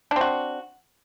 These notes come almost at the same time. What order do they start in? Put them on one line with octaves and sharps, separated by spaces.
D4 C4 F#4